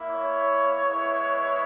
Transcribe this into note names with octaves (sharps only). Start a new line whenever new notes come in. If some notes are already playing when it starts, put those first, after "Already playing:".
Already playing: A#3 E4
C#5
G#3 B3 E4